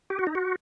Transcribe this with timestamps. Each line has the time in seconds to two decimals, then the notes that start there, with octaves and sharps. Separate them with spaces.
0.10 G4
0.19 F#4
0.27 D#4
0.35 F#4